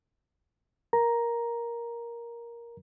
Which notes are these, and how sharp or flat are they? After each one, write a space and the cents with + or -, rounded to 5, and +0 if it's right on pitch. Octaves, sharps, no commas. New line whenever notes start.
A#4 +10 A#5 +5